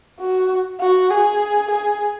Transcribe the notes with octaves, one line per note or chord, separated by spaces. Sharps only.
F#4
F#4
G#4
G#4